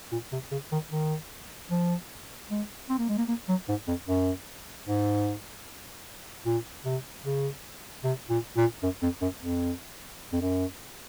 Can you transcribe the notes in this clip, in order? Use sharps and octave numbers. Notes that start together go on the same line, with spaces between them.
A#2
C3
C#3
D#3
D#3
F3
G#3
C4
A#3
G#3
A#3
A#3
F#3
G#2
F2
F#2
G#2
A#2
C3
C#3
C3
A#2
A#2
F#2
F2
F#2
F2
F2
F#2